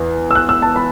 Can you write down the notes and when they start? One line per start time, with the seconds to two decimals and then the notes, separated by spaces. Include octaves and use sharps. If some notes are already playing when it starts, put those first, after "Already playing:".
Already playing: E2
0.31 E6
0.35 F#6
0.49 E6
0.62 A5
0.76 B5